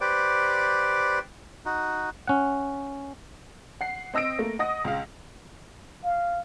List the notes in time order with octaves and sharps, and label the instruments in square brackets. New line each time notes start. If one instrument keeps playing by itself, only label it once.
[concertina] G4 B4 C5 D5 D6
D#4 F#4
[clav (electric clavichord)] C#4 F#5
[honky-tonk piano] F#5 C7
C4 D#5 E6 A#6 D7
A3 A#3
D#5 F#5 D#6 A#6
C#2 F5
[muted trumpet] F5